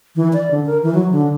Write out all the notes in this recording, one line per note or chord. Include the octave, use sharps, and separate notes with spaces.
E3
D5
D3
A#4
E3
F#3
D3